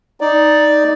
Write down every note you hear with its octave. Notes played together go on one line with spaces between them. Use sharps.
D#4 D5